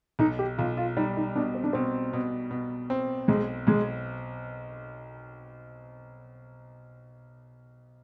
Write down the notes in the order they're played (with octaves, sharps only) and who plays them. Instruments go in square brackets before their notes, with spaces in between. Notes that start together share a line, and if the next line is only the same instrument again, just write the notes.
[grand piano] B1 [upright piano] D#4
[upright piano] G4
[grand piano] B1 [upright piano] F4
[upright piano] F4
[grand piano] G3 [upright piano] D#4
[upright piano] D#4
[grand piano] B2 [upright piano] D4
[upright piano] C4
D4
[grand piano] B2 [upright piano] C4
[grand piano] B2
B2
C4
[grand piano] B1 [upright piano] G#3
[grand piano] B1 [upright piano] G#3